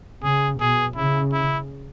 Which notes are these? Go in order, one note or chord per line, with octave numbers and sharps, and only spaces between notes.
C#3 G#4
B2 G#4
C#3 E4
E4